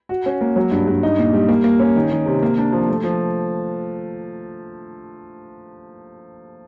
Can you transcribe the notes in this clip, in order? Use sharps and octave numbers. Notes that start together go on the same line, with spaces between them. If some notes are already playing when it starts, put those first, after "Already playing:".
F#4
C#4
A#3
F#3
G2
G2
D#4
A#2
G3
A#3
A#3
C#4
D#3
D#3
C3
A#3
D4
F3
A3
F3